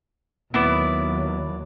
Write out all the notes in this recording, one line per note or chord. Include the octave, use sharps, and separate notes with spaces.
D#2 F#3 B3 E4 D5